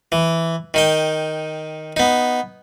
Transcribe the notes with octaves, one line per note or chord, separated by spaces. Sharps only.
E3
D#3 D#4 G5
B3 D#4